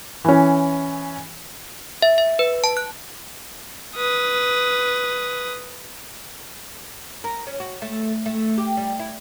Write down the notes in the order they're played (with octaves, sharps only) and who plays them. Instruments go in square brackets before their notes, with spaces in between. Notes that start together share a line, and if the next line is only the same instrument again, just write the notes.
[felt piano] E3 C#4
[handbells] E5
E5
B4
A5
F#6
[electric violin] B4 D#6
[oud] A#4
C#4
F#4
A3
A3
G4
G3
E4